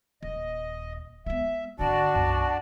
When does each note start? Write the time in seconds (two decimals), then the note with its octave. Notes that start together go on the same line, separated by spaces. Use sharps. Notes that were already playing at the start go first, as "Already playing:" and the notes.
0.23 D#1 D#5
1.26 G#3 B3 E5
1.79 G#1 D3 D4 F#4 D5 A5
2.14 B1 F#2